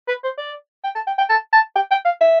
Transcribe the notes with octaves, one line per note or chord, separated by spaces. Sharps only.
B4
C5
D5
G5
A5
G5
G5
A5
A5
G5
G5
F5
E5